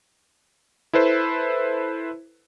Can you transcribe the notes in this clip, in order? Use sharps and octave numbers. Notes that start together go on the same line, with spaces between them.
E4 A4 B4 C5